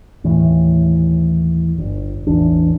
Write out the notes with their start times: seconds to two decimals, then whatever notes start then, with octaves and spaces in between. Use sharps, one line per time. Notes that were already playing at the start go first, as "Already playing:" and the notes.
0.24 D#2 A2 E3
1.78 G1
2.27 A1 E2 D4